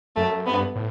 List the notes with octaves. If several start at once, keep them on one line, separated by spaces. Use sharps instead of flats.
F#2 A3
G2 B3
A2